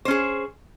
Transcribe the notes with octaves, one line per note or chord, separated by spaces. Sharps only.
C#4 G#4 C5